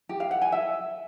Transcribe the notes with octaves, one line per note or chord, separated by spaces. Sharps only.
G4
F5
F#5
G#5
E5